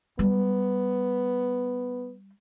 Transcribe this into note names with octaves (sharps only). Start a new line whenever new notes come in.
G3 B3